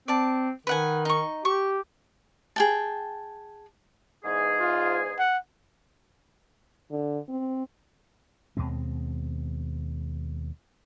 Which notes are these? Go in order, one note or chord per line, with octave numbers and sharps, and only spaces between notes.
C4 D5 A5
D#3 B4 F#5 G#5
D#4 C#6
G4 C#6
G#4 G5 A5
E2 G#2 G#4
F4
F#5
D3
C4
D#2 B2 G#3 C4